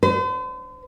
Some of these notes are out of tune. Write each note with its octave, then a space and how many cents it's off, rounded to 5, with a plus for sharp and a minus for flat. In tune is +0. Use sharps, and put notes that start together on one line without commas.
C5 -45